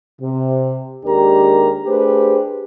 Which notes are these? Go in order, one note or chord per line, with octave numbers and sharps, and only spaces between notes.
C3
D#2 G#3 D4 G4 A#4 A#5
A3 D4 G4 G#4 B4 C5